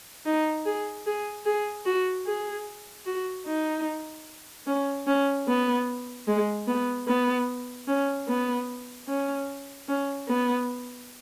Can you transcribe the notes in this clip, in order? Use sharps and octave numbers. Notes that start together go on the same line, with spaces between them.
D#4
G#4
G#4
G#4
F#4
G#4
F#4
D#4
C#4
C#4
B3
G#3
B3
B3
C#4
B3
C#4
C#4
B3